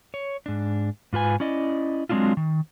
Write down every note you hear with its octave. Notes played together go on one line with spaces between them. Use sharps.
C#5
G#2 D4
G#2 F4 B4 G#5
C#4 E4 D5 D#5
F#3 G#3 C4 D4 E4 F4
D#3